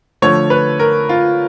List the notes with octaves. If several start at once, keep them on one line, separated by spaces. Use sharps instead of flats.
D3 F3 A3 C#5
B4
A#4
F4